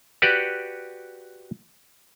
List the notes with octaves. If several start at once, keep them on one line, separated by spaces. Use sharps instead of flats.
F#4 G4 B4 D5 F#5